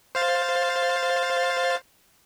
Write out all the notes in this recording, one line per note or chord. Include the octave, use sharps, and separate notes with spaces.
C5 F5 A6